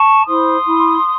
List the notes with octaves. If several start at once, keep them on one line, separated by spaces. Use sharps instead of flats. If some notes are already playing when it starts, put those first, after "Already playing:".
Already playing: A5 C#6
E4 C5 C6 D#6
E4